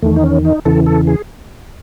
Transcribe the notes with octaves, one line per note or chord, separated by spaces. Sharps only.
E2 D#3 A3
D#4
C#4
D#4
E2 C#3 E3 A4
A4
G#4